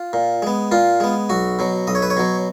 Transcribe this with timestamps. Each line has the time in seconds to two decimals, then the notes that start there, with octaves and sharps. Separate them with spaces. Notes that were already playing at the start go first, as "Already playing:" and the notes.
Already playing: F4
0.13 A#2
0.42 G#3 B3
0.72 A#2 F4
1.00 G#3 B3
1.30 B1 F#4
1.59 B2 F#3
1.87 B1 D#5
1.95 C#5
2.02 B4
2.10 C#5
2.17 B2 F#3